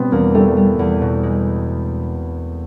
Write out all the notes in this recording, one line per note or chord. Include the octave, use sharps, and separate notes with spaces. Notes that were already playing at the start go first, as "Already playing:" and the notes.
Already playing: B2 G3 B3 C4
E2 A#3
G3 A3
G3
E2
B2
G#3